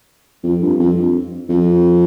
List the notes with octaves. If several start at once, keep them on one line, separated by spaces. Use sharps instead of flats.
F2
G2
F2
F2